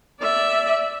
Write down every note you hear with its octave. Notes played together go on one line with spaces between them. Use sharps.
D5 E5